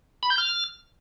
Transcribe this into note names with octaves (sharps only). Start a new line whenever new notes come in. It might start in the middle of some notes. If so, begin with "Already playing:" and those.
B5
G6
F6